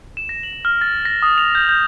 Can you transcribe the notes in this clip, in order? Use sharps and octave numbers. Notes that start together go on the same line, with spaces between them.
E7
A#6
F#7
F6
A6
A#6
D#6
F7
G6
G6